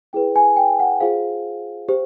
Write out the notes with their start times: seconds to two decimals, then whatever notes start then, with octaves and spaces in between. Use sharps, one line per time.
0.13 E4 G#4 B4 G5
0.36 G#5
0.57 G5
0.79 F#5
1.01 F4 G#4 C5 F5
1.89 G4 C5